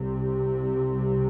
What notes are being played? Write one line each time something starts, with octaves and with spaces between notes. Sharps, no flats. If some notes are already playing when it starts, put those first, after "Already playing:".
Already playing: C2 C3